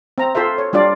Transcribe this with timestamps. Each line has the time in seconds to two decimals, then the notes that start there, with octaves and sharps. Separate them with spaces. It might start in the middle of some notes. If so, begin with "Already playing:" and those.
0.18 C4 A#5
0.35 F4 A4 C5 E5
0.58 C#5
0.73 G3 D4 F4 D5